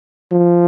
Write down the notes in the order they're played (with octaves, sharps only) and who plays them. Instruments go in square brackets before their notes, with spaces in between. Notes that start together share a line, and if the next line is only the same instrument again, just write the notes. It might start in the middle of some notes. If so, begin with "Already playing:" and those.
[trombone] F3